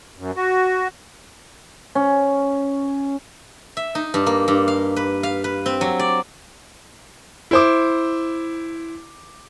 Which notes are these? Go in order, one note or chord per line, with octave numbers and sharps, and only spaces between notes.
F#2
F#4
C#4
E5
D#4
G2
A#3
G2
F5
B4
F5
B4
C4
F#3
D5
E4 C5 D6